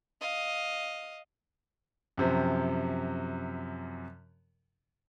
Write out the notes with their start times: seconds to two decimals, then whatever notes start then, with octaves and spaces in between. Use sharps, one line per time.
0.21 D#5 F5
2.18 F#2 C3 F3